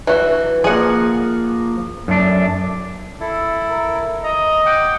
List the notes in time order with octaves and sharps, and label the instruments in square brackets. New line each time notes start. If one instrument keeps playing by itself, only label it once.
[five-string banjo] E3 F#4
[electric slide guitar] F3 A#3 [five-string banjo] G#4 F#5
[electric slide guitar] F#2 A3 D4
[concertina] E4 A4
[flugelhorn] A#4
[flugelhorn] D#5 [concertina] A#5
[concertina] F#5 G5 D6